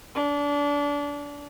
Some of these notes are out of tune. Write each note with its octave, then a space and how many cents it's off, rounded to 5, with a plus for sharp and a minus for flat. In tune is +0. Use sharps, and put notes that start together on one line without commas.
D4 -30